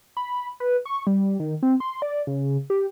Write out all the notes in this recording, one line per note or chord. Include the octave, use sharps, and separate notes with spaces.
B5
B4
C#6
G3
D#3
C4
C6
D5
C#3
G4